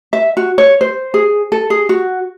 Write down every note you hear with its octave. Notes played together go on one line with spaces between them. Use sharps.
E5
F#4
C#5
C5
G#4
A4
G#4
F#4